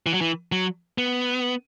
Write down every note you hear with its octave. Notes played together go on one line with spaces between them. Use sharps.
E3
F#3
E3
F#3
B3